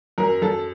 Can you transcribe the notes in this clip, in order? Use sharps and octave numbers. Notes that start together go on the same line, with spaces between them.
F#2 A#4
F#2 A4